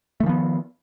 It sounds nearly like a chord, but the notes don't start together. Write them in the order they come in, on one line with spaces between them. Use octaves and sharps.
A3 D#3 F3 B3